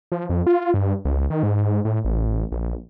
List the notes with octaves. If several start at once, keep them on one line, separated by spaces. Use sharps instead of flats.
F3
F2
F4
G2
C#2
D#3
G#2
A2
A1
A#1